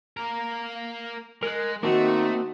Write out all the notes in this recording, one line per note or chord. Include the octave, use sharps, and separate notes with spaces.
A#3 A#4
G#3 A#4 F#6
D#3 A3 A#3 C4 D#4 F#4